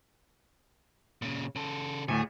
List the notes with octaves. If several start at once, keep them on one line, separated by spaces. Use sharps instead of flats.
A#2 C#3
C#3 A4
D2 A2 C3 G#4